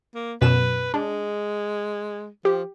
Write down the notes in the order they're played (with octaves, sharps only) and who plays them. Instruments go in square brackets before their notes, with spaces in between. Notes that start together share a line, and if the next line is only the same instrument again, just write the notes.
[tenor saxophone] A#3
[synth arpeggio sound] F#2 B2 E7 [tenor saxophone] B4
[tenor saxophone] G#3 [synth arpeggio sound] D4
[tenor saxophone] F3 [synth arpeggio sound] G4